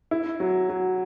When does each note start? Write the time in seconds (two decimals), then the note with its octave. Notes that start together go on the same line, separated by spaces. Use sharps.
0.11 E4
0.40 F#3
0.69 F#3